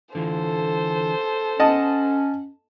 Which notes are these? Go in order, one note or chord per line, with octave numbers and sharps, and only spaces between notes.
D3 E3 F4 A4 C5
C#4 D#5 F#5 A5